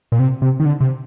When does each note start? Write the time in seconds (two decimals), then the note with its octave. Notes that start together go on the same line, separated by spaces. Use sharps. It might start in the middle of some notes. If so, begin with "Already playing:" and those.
0.12 A#2
0.19 C3
0.42 C3
0.60 D#3
0.65 D3
0.81 C3